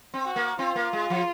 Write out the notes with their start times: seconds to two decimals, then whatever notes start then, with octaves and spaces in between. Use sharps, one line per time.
0.14 C4
0.25 F#4
0.36 A#3
0.59 C4 F4
0.76 A#3
0.93 G#3
1.10 F3